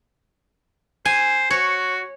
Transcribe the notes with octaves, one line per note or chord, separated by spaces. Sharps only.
C5 G#5
F#4 C#5